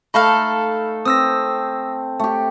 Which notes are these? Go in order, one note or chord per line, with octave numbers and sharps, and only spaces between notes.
A3 D#4 A4 F5 B5 F6
C4 D#6 E6 A#6
A3 G4